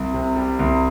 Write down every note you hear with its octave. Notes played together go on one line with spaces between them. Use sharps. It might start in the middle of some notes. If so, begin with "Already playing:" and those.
Already playing: C2
C3
G3
C2